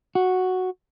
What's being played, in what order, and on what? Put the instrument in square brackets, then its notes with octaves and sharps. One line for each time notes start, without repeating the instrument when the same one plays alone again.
[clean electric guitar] F#4